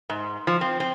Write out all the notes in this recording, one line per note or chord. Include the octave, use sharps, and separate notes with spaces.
G#2
F3
C4
C4